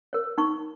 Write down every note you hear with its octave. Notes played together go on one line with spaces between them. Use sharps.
A#4 C#5
D#4 C#6